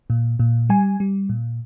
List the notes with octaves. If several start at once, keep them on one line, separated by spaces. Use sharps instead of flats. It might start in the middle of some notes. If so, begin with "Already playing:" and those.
A#2
A#2
G3 G#5
G3
A#2